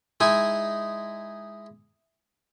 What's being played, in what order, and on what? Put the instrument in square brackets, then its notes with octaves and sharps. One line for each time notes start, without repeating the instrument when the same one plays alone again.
[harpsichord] G#3 D#4 E4 G#5